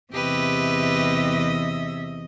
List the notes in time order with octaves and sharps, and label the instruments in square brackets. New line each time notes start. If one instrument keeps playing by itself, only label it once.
[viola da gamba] E2 D#5 [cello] C3 E5 [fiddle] G4 B4